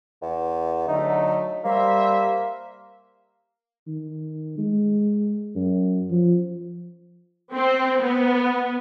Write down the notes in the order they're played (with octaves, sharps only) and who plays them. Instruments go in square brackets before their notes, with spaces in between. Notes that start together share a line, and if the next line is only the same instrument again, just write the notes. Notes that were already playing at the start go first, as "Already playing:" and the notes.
[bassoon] E2
[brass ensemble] D3 F#3 A3 [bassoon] D#4
[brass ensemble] G3 C5 E5 [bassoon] A#3
[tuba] D#3
G#3
F#2
F3
[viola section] C4
B3